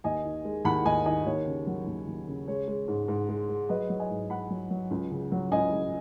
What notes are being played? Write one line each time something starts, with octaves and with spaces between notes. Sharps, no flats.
D#2 D#5 G#5
D#3
G#3
D#2 F#5 B5
D#2 D#5 G#5
D#3 D#5 G#5
D#2 C#5
C#3
F#3
D#2
D#2
C#3
G#3 C#5
G#3
G#2
G#2
G#3
G#3
F#3 B4 D#5
F#3
D#5 G#5
G#2
G#2 F#5 B5
F#3
F#3
C#2
C#3
F#3
C#2 D#5 G#5
C#2